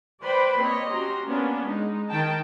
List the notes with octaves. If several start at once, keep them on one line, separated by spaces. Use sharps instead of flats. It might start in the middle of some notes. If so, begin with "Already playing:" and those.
B4 C5 D5 G5 B5 C6
A#3 C4 C#5 D#5
C#4 F#4 G4 A#5 C6
A#3 B3 C#4 D4
G#3 D#4
D#3 G5 A5